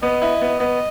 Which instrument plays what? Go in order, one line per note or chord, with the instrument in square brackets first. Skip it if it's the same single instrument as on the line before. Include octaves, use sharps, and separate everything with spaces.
[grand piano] B3 [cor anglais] D#5
[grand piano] E4
B3
[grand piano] B3 [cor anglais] D#5